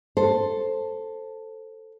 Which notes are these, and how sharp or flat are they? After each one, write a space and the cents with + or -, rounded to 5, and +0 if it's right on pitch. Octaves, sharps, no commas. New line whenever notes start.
A4 +5 C5 +10